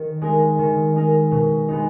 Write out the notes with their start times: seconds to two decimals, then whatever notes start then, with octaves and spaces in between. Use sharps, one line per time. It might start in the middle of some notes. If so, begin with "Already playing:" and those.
Already playing: D#3
0.21 G#3 D#4 A#4
0.59 D#3
0.96 G#3 D#4 A#4
1.31 B2
1.68 G#3 B3 D#4